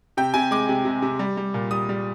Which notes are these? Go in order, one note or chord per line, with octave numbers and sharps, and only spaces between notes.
C3 G5
C3 G#5
G#3 D6
C3
C3
C3
G3
G3
A#2
G3 D#6
G3